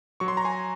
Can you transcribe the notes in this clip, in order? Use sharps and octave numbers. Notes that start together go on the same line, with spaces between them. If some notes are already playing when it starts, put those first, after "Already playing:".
F#3 C#6
C6
A#5
G#5 C6